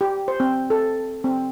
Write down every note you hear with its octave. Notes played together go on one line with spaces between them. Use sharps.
G4
C5
C4
A4
C4